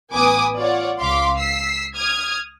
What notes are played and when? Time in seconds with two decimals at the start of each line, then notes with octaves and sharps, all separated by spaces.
0.12 A1 B3 B4 G#5 D6 D#6
0.56 F4 C#5 D5 F#5
1.00 C#2 F5 C6 D6 B6
1.37 E6 B6 C7
1.95 D#6 F6 G#6